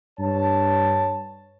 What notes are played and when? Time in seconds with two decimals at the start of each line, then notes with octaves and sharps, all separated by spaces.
0.19 G2 C#5 A5